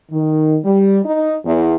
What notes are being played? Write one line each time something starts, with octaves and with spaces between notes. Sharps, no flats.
D#3
G3
D#4
E2